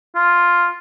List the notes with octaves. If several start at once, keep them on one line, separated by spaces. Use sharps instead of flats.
F4